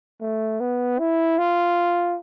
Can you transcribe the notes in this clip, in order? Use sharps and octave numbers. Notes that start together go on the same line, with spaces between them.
A3
B3
E4
F4